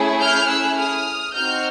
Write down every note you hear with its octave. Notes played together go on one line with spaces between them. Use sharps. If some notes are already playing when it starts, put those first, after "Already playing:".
Already playing: A3 C#4 E4 G#4
F6 G6
E6 F#6
D#6 F6
C4 D#4 F#4 F6 G6